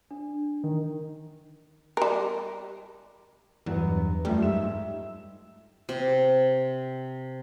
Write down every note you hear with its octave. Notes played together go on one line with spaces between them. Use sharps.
D4
D#3
G3 A#4
E2 G2 F#3 B3
F#2 F3 G3 A3
G#2 E5 E7
C3